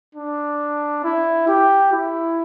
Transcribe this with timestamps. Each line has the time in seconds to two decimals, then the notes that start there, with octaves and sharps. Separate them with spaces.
0.15 D4
1.04 E4
1.48 G4
1.92 E4